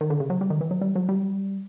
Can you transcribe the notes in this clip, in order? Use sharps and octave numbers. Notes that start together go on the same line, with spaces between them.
D#3
D3
C#3
F#3
G3
D#3
E3
F#3
G3
F#3
G3